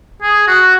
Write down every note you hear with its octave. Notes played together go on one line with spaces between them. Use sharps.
G#4
F#4